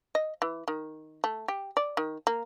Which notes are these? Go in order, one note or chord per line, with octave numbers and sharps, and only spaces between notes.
D#5
E3
D#3
A3
G4
D5
D#3
A#3